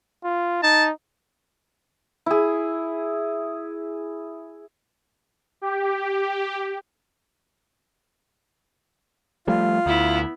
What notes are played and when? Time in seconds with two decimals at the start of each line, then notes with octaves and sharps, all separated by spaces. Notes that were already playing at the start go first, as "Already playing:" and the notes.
0.24 F4
0.63 D#4 A5
2.26 E4 G#4
5.61 G4
9.47 F3 G3 A3 F4
9.86 D2 B3 E4